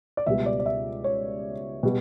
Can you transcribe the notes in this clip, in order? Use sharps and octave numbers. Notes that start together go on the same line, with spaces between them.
D5
C#2 B2 G3 E5
D5
D5
E5
C#5
B2 G3